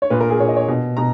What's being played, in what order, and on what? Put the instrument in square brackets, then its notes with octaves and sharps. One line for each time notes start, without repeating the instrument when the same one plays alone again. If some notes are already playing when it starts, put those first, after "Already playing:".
[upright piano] C#5
A#2 B4
A#4
G#4
A#2 C#5
D#5
C#5
B2
B2 A#5